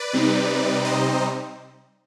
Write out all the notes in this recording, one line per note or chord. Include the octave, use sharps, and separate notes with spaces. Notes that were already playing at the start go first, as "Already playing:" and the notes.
Already playing: B4 D5
C3 G3 C4 D#4
C5 D#5